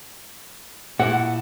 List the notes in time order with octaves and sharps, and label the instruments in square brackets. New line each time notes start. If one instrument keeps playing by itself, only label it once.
[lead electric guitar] A#2 E4 [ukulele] F#5